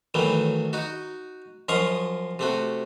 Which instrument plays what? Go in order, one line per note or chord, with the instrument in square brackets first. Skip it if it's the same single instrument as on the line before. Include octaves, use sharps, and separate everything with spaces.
[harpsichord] A2 D#3 E3 F#3 A3
D#4 F#4
F#2 F3 D#5 F5 C#6 D#6
C3 A3 F#4